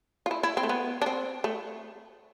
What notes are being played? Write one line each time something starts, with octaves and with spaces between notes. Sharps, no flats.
F4
E4
E4
C4
A3
B3
D4
C4
A3